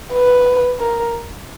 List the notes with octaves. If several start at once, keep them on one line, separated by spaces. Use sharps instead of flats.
B4
A#4